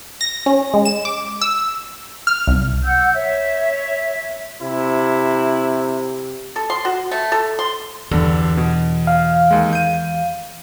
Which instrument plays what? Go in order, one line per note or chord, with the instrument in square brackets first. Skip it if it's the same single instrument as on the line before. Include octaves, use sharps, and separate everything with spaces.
[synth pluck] A#6
C#4
G#3
E7
D6
E6
F6
C2
[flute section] F#5 E6 G6
C#5 E5
[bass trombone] C3 [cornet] E4
[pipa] A4
C6
F#4
A3
A4
C6
[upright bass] E2 [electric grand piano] G2 D3
[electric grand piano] B2
[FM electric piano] F5
[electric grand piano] D#2 G#3
G6 D#7